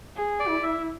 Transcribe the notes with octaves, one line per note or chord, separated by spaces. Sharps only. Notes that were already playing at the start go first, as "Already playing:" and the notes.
G#4
D5
E4
E5